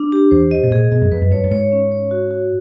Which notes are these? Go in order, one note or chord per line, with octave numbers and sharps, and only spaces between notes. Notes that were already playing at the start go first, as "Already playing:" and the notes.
Already playing: D4
G4
E2 C5
D#5
B2
A#2 G#4
B2 D#5
F#2
F2 B4
F#2
G2 C#5
G2
G#2 C#5
C#4
C#5
F#4
F#4